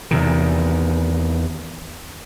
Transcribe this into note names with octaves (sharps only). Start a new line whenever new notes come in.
E2 C3 D#3